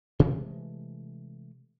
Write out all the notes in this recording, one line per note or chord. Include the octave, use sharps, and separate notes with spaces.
C3 E3 G#3 A3